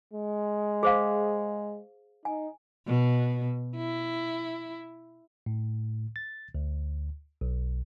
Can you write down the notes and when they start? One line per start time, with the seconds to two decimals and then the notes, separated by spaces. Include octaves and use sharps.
0.13 G#3
0.83 G#4 C5 F5
2.25 D#4 G#5
2.87 B2
3.76 E4
5.46 A2
6.16 A6
6.55 D2
7.41 B1